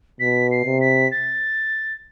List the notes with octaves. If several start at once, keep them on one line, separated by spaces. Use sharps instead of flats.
B2 B6
C7
C3
B6
A6